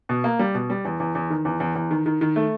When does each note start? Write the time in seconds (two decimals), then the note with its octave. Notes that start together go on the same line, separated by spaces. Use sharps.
0.09 B2
0.24 A#3
0.39 G3
0.55 B2
0.70 G3
0.85 E2
1.00 E2
1.15 E2
1.30 D#3
1.45 E2
1.60 E2
1.75 E2
1.91 D#3
2.06 D#3
2.21 D#3
2.36 A3